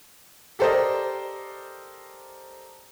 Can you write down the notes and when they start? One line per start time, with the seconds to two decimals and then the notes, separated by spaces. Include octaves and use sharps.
0.59 G4 A4 A#4 C5 D5 D#5